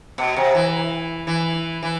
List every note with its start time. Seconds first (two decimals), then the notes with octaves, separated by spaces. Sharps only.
0.18 B2
0.37 C3
0.55 E3
1.27 E3
1.83 E3